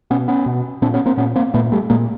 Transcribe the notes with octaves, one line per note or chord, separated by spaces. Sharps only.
B2 B3 C#4
B3 C#4
B2
A#2 C4 D4
B3 C#4
A#3 C4
A#2 B3 C#4
A#3 C4
A#2 A3 B3
G3 A3
A#2 G#3 A#3